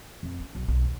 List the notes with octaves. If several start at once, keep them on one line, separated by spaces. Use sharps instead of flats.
F2
C#4
B1
B1
D#2